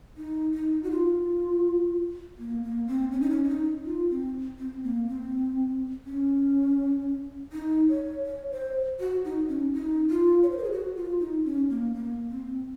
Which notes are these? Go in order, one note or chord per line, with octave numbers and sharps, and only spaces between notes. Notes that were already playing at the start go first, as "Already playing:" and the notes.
D#4
D#4
F#4
F4
A#3
A#3
C4
C#4
D#4
C#4
C#4
D#4
F4
C4
C4
A#3
C4
C#4
D#4
C#5
C#5
C5
F#4
D#4
C#4
D#4
F4
C#5
C5
A#4
G#4
F#4
F4
D#4
C#4
A#3
A#3
C4